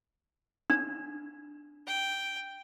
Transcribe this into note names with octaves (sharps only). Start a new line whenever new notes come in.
D4
G5